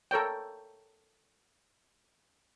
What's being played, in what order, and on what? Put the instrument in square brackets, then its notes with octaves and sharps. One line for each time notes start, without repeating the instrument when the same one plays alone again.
[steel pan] A4 A#4 C#5 G5